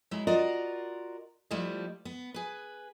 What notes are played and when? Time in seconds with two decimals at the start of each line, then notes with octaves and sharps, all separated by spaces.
0.11 F#3 G#3 E4
0.27 F4 F#4 A#4 D5 D#5
1.51 F3 G3 A3 E4 D#5
2.05 B3
2.34 G#4 B4